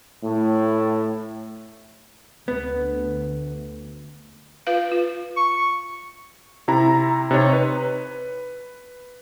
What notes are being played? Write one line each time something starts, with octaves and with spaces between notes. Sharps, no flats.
A2
D2 B3
F4 B4 F5
F4
C#6
C3 E4 A#5
C3 D#4 C#5
B4